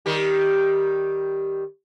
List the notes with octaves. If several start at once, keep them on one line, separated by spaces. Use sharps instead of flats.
D#3 G3 G4